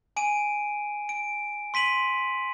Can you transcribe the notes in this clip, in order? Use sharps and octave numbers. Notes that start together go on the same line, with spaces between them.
G#5 D7 D#7
D7
C6 B6 D#7 F#7